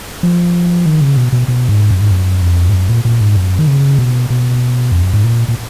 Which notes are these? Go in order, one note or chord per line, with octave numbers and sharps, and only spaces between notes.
F3
D#3
C#3
B2
B2
B2
G#2
F#2
G#2
F#2
F2
G#2
F#2
A#2
A#2
G#2
F#2
D#3
C#3
B2
B2
F2
F#2
G#2
A#2
A#2